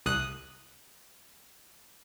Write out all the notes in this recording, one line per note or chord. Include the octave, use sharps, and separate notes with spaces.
C2 D#6 F#6